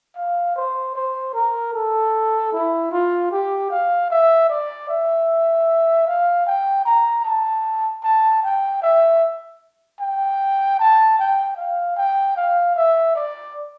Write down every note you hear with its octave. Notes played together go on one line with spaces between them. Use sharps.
F5
C5
C5
A#4
A4
E4
F4
G4
F5
E5
D5
E5
F5
G5
A#5
A5
A5
G5
E5
G5
A5
G5
F5
G5
F5
E5
D5